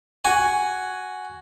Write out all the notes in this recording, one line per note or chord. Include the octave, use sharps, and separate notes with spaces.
F#4 G#5